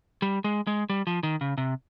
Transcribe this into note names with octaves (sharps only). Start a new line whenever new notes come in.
G3
G#3
G#3
G3
F3
D#3
C#3
C3